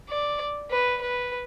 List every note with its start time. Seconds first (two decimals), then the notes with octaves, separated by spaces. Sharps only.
0.09 D5
0.71 B4
1.01 B4